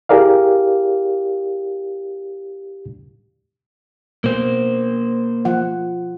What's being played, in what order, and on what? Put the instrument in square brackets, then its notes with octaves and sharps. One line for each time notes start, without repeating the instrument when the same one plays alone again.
[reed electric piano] E4 G4 G#4 A#4 D5 F5
[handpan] B2 [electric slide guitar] A#3 C5
[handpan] F3 F4 F#5